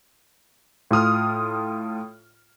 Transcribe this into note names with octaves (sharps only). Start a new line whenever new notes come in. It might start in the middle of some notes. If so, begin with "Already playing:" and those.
A2 F4 D#6 F6